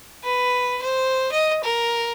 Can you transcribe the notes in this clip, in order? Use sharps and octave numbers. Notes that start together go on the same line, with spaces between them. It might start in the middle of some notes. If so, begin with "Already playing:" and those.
B4
C5
D#5
A#4